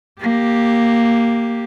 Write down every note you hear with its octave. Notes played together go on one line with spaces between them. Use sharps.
A#3 G4